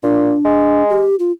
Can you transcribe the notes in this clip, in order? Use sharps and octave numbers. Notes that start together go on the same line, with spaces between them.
A#2 D4
G#3
G4
F4